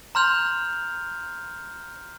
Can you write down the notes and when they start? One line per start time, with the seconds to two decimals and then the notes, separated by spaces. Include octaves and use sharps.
0.15 A#5 C6 F6 G6 F7